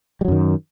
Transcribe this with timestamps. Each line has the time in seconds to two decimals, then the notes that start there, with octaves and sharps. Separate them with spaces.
0.21 G3
0.25 F#3
0.28 F#2
0.32 D#3